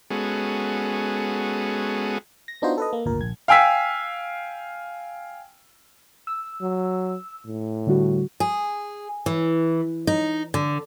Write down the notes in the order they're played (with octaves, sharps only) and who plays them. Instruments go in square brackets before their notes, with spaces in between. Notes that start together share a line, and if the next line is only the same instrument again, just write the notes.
[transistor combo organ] G#3 B3 C#4 F#4 G#4 A4
[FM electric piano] A#6
B3 D4 D#4 F4 F#4 C5
A4 B4 D#5
A#3
G#1 D2 A#2 A#4
A#1 G#6
[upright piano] F5 G5 G#5 E6 B6
[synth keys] E6
[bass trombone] F#3
A2
[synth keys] D3 G3 F#4
[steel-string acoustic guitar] G#4
E3
D#4
D3